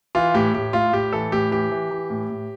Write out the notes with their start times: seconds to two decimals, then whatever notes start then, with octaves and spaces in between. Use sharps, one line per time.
0.15 E3 F4
0.34 A2 G4
0.54 A2 G4
0.73 A2 F4
0.93 A2 G4
1.13 E3 A4
1.32 A2 G4
1.51 E3 G4
1.71 E3
1.91 E3
2.10 A2
2.30 A2